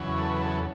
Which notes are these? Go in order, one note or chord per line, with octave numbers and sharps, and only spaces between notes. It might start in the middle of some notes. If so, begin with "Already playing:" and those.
Already playing: E2 C#3 F#3
A4
B4
A4